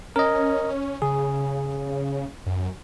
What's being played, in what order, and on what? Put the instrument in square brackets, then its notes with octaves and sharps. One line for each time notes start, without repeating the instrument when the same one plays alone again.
[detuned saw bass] C#4 [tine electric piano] A#4 D#5
[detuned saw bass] C#3 [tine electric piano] G#4
[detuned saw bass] F#2